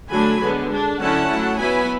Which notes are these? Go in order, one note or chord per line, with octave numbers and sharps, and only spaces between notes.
D3 F#3 A3 D4 G#5 B5
D3 G#3 B3
G#3 D4
D3 F#3 C#4 E4 F#5 A5
F#3 A3 E4
F#3 B3 E4 G#5 B5